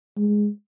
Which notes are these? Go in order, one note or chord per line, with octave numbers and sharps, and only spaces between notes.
G#3